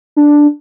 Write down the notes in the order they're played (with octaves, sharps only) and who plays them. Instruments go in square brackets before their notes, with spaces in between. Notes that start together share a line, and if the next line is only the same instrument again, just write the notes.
[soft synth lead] D4